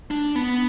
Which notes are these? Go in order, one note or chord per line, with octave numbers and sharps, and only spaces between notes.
D4
B3